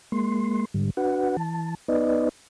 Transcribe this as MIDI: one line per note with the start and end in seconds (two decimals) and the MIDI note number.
0.12 0.65 56
0.12 0.65 58
0.12 0.65 84
0.74 0.90 44
0.74 0.90 50
0.74 0.90 55
0.97 1.37 62
0.97 1.37 66
0.97 1.37 71
0.97 1.37 78
1.37 1.75 52
1.37 1.75 81
1.88 2.29 59
1.88 2.29 63
1.88 2.29 71
1.88 2.29 74
1.88 2.29 75